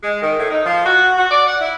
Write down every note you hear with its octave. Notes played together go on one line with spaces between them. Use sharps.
G#3
D#3
A2
D#4
F3
F#4
F#4
D5
F#5
E4